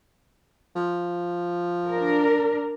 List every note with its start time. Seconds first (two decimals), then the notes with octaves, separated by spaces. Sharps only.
0.75 F3
1.90 D4 A#4